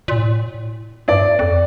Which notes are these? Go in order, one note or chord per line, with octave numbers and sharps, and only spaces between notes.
A#2
A2
G2 D5
F2